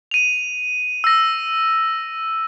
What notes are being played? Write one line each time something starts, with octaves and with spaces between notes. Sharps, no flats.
D#7 F7
E6 A#6